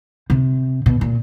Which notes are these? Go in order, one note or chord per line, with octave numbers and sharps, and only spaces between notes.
C3
B2
A#2